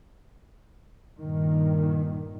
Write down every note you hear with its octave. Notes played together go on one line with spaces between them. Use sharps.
G2 A#2 D#3